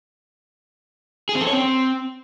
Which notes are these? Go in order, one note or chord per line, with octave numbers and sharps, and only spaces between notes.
G#4
C4
A4
C#5
C4